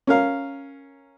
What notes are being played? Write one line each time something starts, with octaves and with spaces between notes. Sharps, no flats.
C#4 A#4 F5